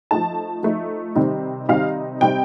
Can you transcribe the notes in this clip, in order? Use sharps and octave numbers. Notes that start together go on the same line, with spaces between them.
F3 A3 D#4 A5
F3 A3 D#4
C3 D#3 G3 C4 D#4
C3 D#3 G3 C4 D#4 F5
C3 G3 C4 D#4 G5